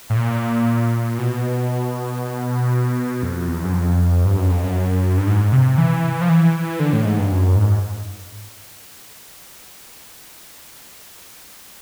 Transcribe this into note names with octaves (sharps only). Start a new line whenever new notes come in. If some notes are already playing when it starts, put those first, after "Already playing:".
A2
A#2
B2
F2
E2
F#2
F2
G2
F#2
F2
F#2
G2
G#2
C3
E3
F3
E3
D3
A2
G#2
G2
F#2
G#2